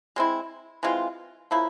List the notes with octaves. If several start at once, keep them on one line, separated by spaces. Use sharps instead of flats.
G#3 C4 E4
E3 G#3 C4 F4
C#3 F3 A#3 E4